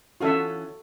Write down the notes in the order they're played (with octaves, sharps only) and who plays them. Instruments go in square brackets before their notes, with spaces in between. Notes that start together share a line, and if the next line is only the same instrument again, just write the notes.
[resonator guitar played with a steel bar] E3 C#4 F4 [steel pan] F#4 A4 E5